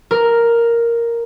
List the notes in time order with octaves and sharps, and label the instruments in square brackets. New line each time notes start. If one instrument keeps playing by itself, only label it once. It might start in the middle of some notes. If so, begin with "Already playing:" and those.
[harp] A#4